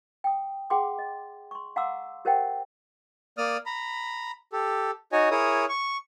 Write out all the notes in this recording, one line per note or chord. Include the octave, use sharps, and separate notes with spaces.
G5 D#6
G#4 F#5 G5 C6 D6
D#5
C6 C#6
F5 F#5 A#5 C6 D6 E6
G4 A#4 C5 D#5 F#5 G5
A#3 D5 D#6 F6
A#5 B5
G4 A4
D#4 F#4 C#5 D#5 G#5
E4 G#4 A#4 C#5 D#6
C#6